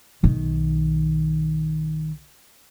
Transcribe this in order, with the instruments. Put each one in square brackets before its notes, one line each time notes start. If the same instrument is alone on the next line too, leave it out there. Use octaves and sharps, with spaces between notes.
[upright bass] B1 D#3